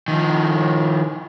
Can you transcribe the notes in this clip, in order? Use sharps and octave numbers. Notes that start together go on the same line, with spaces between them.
D#3 F3